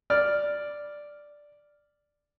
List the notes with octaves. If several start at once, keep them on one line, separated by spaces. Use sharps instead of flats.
D5 F6